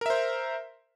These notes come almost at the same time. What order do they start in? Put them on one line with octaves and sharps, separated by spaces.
A#4 E5 C5